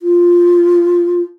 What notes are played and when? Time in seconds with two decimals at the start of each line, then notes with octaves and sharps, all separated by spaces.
0.02 F4